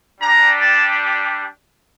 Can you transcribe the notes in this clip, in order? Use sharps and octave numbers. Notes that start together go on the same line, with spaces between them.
G3 D4 G4 A#5
A5